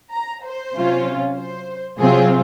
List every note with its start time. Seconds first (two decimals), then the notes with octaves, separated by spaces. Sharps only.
0.13 A#5
0.45 C5
0.75 C3 F#3 C#4 F4
1.37 C5
1.98 C3 F#3 C4 F4 G#4